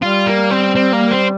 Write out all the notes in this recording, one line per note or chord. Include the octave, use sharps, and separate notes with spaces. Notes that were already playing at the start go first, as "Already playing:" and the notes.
G3 F4
A#3
C4
C4
A#3
C4